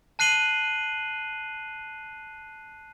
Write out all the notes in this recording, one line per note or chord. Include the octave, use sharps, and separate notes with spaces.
A5 F#6 C7 D#7 F#7 G7